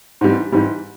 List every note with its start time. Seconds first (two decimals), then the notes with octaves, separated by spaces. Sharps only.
0.21 G#2 E3 G3
0.52 G#2 E3 G3